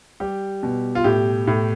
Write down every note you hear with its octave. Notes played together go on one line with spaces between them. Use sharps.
G3 G4
B2
F4
A2 G4
A2